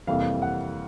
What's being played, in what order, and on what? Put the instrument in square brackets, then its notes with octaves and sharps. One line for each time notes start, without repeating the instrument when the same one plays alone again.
[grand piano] F2 C3 E3 G3 A#3 F5
F#5